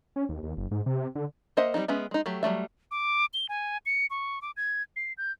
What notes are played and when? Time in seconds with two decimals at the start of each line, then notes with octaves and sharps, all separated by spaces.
0.16 C#4
0.29 D#2
0.43 D#2
0.57 F#1
0.71 G#2
0.86 C3
1.15 D3
1.57 A#3 C5 D#5 E5 F#5
1.74 G3 A3 C4 D#4
1.88 G#3 B3 C#4 E5
2.11 G#3 D#4
2.26 F#3 A3 G4
2.43 F#3 G3 A3 E5
2.91 D6
3.34 G7
3.49 G#5
3.86 C#7
4.10 C#6
4.42 D6
4.57 G#6
4.96 C7
5.18 G6